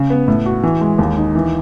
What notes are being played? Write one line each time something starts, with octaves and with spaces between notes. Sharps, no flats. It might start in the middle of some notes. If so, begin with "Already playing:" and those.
Already playing: C#3
B3
A2
F#4
E3
G#3
D#2
D#4
E3